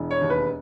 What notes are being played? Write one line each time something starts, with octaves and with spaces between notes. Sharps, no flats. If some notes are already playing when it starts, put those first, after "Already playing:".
Already playing: E1 E3
C#5
D#2
B4